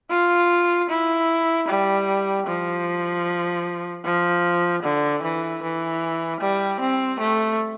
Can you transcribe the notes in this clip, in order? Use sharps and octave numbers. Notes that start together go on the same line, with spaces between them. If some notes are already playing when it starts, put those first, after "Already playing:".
F4
E4
G3
F3
F3
D3
E3
E3
G3
C4
A3